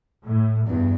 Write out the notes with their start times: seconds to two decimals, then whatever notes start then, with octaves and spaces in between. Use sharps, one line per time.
0.25 A2
0.67 E2 G2